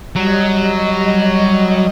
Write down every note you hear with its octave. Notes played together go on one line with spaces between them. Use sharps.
F#3 G3 D#5